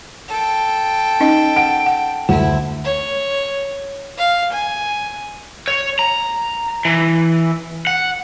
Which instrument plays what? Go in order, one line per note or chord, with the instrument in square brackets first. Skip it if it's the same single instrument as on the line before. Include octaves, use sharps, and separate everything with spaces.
[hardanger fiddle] A4 G5
[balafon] C#4 D#4 D#5
[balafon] F#5 [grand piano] D7
[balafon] F#5
[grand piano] D2 [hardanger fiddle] E4 [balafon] F#5
[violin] C#5
F5
G#5
[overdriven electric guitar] C#5
A#5
E3
F#5